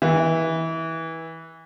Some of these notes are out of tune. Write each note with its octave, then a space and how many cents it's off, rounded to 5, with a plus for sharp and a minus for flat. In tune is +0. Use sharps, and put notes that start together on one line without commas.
E3 -20